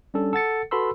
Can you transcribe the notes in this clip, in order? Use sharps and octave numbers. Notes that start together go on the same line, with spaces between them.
G3 C#4 D4 A4
A4 F#5 A6 C#7
F#4 A4 B4 B5 C6 E6